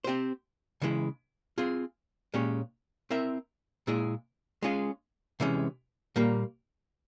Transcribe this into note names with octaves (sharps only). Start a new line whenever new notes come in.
C4 G4 C5
C#3 E3 G#3 E4
C4 F4 G#4
A#2 G#3 C#4 G4 C#5
C4 E4 A#4 E5
A#2 G#3 E4 G#4
G#3 C#4 F4 G#4
C3 E3 G#3 C#4
A#2 G3 A#3